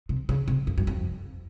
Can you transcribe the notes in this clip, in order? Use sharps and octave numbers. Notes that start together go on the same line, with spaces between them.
C3
C#3
C3
F2
F#2
F2